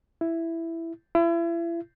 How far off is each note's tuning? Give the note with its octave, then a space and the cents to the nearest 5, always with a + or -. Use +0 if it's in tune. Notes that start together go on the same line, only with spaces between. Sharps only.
E4 +5
E4 +35